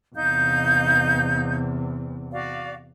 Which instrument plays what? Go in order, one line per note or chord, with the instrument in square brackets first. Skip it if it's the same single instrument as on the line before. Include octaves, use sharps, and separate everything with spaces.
[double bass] E2 C3 [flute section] D#4 F5 G6
[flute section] F#4 D5 F5